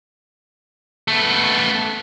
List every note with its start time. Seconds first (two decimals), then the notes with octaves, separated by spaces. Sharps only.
1.08 A3 B3